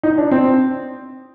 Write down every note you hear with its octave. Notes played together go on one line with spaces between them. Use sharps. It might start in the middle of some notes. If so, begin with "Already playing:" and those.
D#4
D4
C4